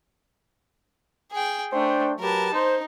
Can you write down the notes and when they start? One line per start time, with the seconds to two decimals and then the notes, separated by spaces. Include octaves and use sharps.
1.32 G#4 G5
1.72 A3 D4 C5 G5
2.20 F#3 G4 A#4 B4 A5
2.53 D#4 C5